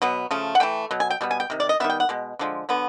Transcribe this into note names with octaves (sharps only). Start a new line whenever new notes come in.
B2 F#3 B3
C#3 F3 A3
F#5
E3 A3 G5
B2 F#3
G#5
G5
B2 G3 B3
G#5
G5
C3 D#3
D5
D#5
D#3 G3 B3 E5
G5
F#5
B2 G#3
D3 F3 G#3
D3 F#3 B3